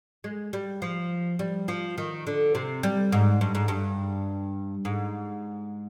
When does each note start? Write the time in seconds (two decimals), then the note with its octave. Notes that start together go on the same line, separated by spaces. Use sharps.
0.24 G#3
0.53 G3
0.82 F3
1.39 G3
1.68 F3
1.98 D#3
2.27 D3
2.55 C3
2.83 G3
3.12 G#2
3.41 G2
3.55 G#2
3.68 G2
4.85 G#2